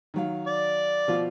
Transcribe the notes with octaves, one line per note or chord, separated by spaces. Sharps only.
D#3 F#3 F5
D5
B2 F3 F4